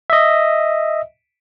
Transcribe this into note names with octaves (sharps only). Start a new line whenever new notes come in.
D#5 E5